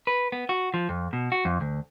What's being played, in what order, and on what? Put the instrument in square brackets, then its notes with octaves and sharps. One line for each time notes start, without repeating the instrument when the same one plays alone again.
[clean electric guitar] B4
B3
F#4
F3
F2
B2
F#4
F2
D2